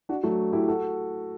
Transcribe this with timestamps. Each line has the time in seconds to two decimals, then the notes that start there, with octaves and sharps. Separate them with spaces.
0.09 D4 F#4
0.24 F#3 A3
0.53 E4 G4
0.68 F#4 A4